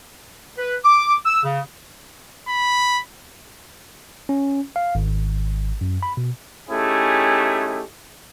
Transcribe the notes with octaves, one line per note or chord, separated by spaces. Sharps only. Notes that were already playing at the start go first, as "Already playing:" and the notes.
B4
D6
E6
C#3
B5
C#4
F5
G#1
F#2
B5
B2
A3 C#4 D#4 E4 G4 G#4